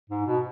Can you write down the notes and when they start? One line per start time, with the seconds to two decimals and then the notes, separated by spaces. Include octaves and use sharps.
0.10 G#2
0.27 B2